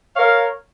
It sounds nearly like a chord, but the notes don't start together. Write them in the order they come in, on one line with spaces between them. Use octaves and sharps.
C#5 F5 A#4